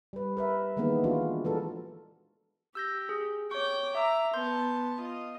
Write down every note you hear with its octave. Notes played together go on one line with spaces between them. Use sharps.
G3 B4
A#4 B4 E5
D#3 E3 G#3 A#3 B3 D#4
F3 G#3 D4 F4 F#4
E3 G#3 A4 A#4
G4 E6 G6 A#6
G#4
C#5 G5 C#6 D6
E5 A#5 D6 E6
B3 A5 C6 G6
F4 D#5